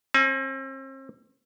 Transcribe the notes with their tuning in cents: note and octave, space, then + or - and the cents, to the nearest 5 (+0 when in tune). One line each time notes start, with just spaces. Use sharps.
C4 +40 G#5 +25